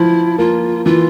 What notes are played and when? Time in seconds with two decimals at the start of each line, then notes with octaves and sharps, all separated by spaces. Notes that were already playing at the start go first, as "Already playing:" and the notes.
Already playing: F3 E4
0.38 A#3 F4
0.85 E3 F4